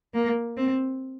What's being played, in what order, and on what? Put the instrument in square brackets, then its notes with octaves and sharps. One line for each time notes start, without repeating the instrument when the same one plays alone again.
[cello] A#3
C4